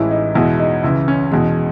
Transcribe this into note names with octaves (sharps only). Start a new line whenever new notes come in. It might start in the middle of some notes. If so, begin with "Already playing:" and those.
Already playing: A1 A2 E3 G#3 E4
D#4
E2 B2 G#3 E4
D#4
C#2 C#3 E3 E4
C#4
E2 B2 G#3 C#4